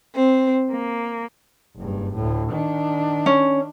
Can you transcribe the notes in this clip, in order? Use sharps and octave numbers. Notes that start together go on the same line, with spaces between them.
C4
A#3
F#1 G2
D2 A2
D#3 D4
C#4